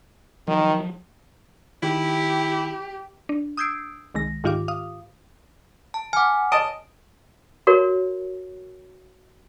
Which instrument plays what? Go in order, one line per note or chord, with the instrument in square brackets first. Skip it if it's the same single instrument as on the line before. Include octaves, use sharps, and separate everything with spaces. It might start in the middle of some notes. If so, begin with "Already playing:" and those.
[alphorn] D#3 [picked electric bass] F3 F#3
[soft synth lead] D#3 [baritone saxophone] E4 [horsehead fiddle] G4
[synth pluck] D4
D#6 E6 G6 G#6 C7 D7
C2 D#3 G#3 A#6
G#2 D#3 F4 G4 F5 D6
F5 D#6
[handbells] A5
[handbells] F#5 G#5 [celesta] D6 F6
[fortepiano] D#5 A5 [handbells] D7
[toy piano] F#4 A#4 C#5